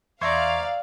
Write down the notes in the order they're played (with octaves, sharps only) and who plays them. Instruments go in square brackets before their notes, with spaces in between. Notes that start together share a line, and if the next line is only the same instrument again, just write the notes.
[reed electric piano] E2 C#6 G#6 [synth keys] C5 E5 A#5 [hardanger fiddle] D5 [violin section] F5